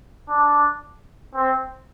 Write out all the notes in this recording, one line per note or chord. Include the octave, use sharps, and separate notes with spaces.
D4
C4